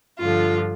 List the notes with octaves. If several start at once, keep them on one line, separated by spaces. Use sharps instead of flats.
G2 D3 F3 F4